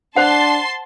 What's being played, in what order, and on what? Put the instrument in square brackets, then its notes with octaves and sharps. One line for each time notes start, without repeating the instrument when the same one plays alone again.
[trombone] D4 [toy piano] C5 F#5 [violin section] A5 C6